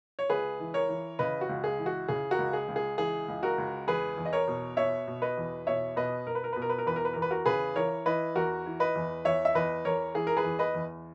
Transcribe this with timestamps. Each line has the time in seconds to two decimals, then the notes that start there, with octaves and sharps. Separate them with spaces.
0.19 C#5
0.30 C#2 G#4 B4
0.60 E3
0.74 A#4 C#5
0.89 E3
1.19 C#3 B4 D#5
1.41 F#4
1.49 C#2
1.64 G#4
1.79 E3
1.86 F#4
2.08 C#3 G#4
2.31 F#4 A#4
2.38 C#2
2.53 G#4
2.68 C#2
2.76 G#4
2.98 E3 G#4
3.28 C#2
3.43 F#4 A#4
3.58 C#2
3.88 E2 G#4 B4
4.18 E2
4.25 D#5
4.33 A#4 C#5
4.48 B2
4.77 B2 C#5 E5
5.07 B2
5.22 B4 D#5
5.38 E2
5.67 B2 C#5 E5
5.96 B2 B4 D#5
6.26 B2 A#4
6.35 B4
6.44 A#4
6.53 B2 B4
6.62 A#4
6.69 B4
6.78 A#4
6.86 E2 B4
6.96 A#4
7.05 B4
7.13 E2 A#4
7.22 B4
7.31 F#4 A#4
7.46 C#3 G#4 B4
7.76 E3 A#4 C#5
8.06 E3 B4 D#5
8.36 E2 F#4 A#4
8.66 E3
8.80 B4 D#5
8.96 E2
9.25 E2 C#5 E5
9.45 E5
9.55 E2 B4 D#5
9.85 E2 A#4 C#5
10.15 E3 G#4
10.27 A#4
10.37 G#4 B4
10.45 E2
10.59 B4 D#5
10.74 E2